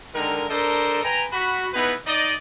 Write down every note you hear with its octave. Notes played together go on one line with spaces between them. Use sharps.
D3 D#3 G#3 A#4
D4 A4 A#4 C5 D5 D#5
B4 G5 G#5 A#5
F#4 B5
B3 D#4 E4 G#4 B4
D#4 D5 D#5